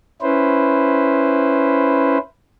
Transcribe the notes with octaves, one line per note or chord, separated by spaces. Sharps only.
C#4 E4 B4 C5